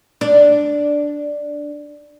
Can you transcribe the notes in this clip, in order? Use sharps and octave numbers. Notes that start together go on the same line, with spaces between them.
D4 D5